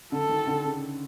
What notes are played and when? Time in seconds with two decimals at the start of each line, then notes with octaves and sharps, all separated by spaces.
0.12 D3 A4
0.29 D#3
0.47 D3
0.64 C#3